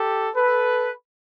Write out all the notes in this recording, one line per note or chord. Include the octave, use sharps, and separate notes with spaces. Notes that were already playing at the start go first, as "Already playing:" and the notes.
Already playing: G4 A4
A4 B4